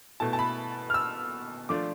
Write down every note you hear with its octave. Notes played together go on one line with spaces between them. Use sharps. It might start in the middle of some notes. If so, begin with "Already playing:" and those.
B2 A3 E4 A5
A5
B5
F6
E6
F3 A3 D4 F4 D6